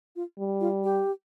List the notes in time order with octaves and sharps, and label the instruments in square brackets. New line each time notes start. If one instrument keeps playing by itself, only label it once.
[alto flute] F4
[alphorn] G3
[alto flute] F4
G4